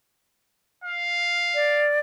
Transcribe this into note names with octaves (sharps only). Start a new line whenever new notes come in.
F5
D5